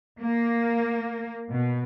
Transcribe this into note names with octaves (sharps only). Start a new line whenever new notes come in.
A#3
B2